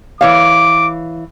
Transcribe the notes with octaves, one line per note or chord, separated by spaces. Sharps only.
E3 C#5 F5 D6